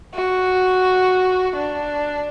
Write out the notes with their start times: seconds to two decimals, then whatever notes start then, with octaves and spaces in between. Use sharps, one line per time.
0.14 F#4
1.56 D4